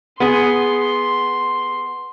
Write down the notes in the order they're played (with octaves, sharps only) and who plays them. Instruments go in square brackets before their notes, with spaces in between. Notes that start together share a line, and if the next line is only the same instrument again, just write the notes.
[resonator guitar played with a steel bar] B3 G#4 [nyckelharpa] C6